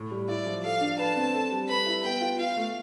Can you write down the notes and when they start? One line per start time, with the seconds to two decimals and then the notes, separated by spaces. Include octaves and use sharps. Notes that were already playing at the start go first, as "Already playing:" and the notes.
Already playing: A2
0.11 G3
0.28 E4 D5
0.46 F3
0.64 A4 F5
0.81 D4
0.99 B4 A5
1.16 C4
1.34 A4
1.51 G3
1.69 B4 B5
1.86 E4
2.04 B3 G5
2.21 F4
2.39 F4 F5
2.56 A3